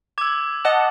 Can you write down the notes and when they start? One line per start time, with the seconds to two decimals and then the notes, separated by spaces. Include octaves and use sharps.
0.18 D6 E6 G#6
0.65 D#5 F#5 A5